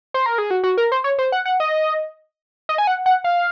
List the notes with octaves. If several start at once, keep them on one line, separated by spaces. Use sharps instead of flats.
C5
A#4
G#4
F#4
F#4
A#4
C5
C#5
C5
F#5
F#5
D#5
D#5
G#5
F#5
F#5
F5